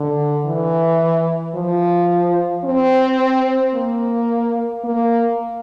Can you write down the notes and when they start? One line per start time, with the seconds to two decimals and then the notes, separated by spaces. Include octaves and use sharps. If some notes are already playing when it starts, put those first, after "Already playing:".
Already playing: D3
0.46 E3
1.55 F3
2.65 C4
3.75 A#3
4.85 A#3